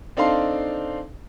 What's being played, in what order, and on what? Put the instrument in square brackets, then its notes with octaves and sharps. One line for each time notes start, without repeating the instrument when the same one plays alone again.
[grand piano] C4 D4 D#4 A4 F5 C6